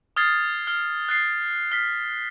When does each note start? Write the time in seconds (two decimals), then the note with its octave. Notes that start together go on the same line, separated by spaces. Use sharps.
0.16 D#6 F6 G#6 A6 C7
0.67 F6
1.09 F#6 A6 C7
1.72 F6 B6